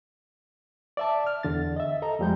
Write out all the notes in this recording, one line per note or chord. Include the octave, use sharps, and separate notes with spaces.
D5 E5 A5
F6
E2 D3 A6
D#5 E5
A4 D#5 A#5
F2 F3 G3 G#3 G6